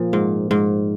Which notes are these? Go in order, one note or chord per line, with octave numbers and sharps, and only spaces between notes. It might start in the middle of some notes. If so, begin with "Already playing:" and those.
Already playing: A#2 F3
G#2
G#2